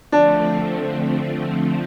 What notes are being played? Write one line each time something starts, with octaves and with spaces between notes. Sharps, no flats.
D3 F3 A3 C4 D4